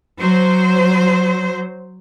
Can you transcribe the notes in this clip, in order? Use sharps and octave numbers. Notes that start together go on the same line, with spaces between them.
F#3 C5